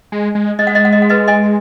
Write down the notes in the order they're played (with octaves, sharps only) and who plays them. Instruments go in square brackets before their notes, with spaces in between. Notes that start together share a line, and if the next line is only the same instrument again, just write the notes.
[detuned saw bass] G#3
G#3
[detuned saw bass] G#3 [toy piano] D#5
[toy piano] F#5
D#5
F#5
D#5
F#5
B4 D#5
D#5 G#5